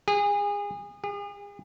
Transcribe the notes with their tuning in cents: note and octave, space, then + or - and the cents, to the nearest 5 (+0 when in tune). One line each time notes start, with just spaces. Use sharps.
G#4 -30
G#4 -40